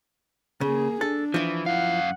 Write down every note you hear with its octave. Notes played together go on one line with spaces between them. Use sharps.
C#3 A#3 G#4
D4 A4
E3 F3 E4
F#2 F5 F#5